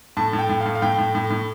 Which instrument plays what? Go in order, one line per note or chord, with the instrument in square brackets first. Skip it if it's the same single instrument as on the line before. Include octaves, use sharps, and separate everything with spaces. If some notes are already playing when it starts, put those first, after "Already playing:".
[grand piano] A2 A5
A2
G5
A2
F5
A2
F5
A2 G5
A2
A2
A2